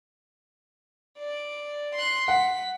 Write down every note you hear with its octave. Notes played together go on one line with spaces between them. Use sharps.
D5
C6 F#6
F#5 B6